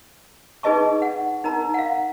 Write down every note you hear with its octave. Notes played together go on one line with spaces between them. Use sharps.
D#4 G#4 B4 D#5 A5 C#6
F#5
D#4 A#4 A#5
F5 F#5